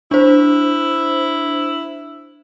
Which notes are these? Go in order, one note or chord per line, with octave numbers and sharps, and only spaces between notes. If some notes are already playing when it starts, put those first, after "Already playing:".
D4 E4 C5